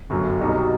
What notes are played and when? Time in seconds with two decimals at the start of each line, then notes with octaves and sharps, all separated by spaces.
0.10 G1 F#2 F#3
0.40 C2 B2 G3 D#4 F#4